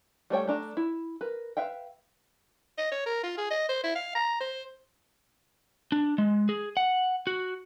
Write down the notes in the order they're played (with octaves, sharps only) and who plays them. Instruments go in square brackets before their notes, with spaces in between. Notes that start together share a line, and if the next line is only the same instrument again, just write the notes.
[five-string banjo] G3 A3 C#5 G5
A3 D4 A#5
E4
A#4 B4
B4 E5 F5 G5
[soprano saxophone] D#5
C#5
A#4
F4
G#4
D#5
C5
E4
F5
A#5
C5
[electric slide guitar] D4
G#3
G#4
F#5
F#4